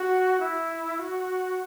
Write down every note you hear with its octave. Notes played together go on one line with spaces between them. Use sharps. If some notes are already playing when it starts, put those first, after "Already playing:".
Already playing: F#4
E4
F#4